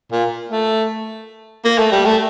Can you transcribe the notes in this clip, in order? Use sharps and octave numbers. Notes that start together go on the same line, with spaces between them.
A#2
A3
A#3
A3
G3
A3